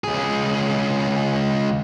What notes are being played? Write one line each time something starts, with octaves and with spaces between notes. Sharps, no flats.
C#2 G#4